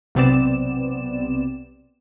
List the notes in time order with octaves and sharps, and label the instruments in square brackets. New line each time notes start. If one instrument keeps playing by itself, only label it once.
[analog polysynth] B1 C3 B3 C4 D5 E7